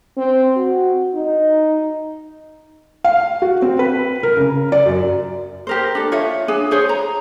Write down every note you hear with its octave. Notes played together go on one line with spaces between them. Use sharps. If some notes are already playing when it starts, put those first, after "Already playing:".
C4
F#4
D#4
F5
F#4
C4
B4
A#4
C#3
D5
F#2
G4 A#4 C5
D4 A4
F4 C#5 E5
D4 G#4 G#5
G#4 C5 C#5
A#5